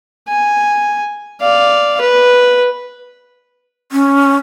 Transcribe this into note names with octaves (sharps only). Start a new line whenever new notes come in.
G#5
D5 F5
B4
C#4